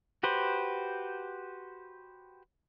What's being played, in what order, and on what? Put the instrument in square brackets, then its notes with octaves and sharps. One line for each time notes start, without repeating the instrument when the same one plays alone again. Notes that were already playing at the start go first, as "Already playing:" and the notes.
[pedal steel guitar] F#4 G4 B4 C5